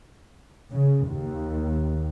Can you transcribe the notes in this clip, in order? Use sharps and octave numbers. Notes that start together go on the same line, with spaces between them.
C#3
D#2